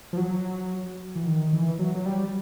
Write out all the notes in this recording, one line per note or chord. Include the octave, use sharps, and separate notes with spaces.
F3
F#3
E3
D#3
E3
F#3
F#3
G3